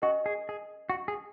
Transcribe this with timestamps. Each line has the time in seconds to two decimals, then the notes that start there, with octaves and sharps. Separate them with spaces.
0.02 C#4 F#4 A#4 D#5 G#5 C#6
0.26 G#4
0.49 G#4
0.90 F#4
1.08 G#4